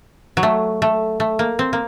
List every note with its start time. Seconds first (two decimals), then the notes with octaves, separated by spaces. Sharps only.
0.37 F#3
0.43 A3
0.82 A3
1.20 A3
1.39 A#3
1.59 C4
1.73 A#3